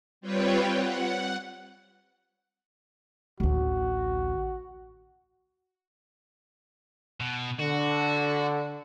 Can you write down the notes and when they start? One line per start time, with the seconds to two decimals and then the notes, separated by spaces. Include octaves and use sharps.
0.21 G3 C4 F4 B4 C#5 G5
0.71 F#5
3.40 A1 D2 F#4
7.20 B2
7.60 D3 F#4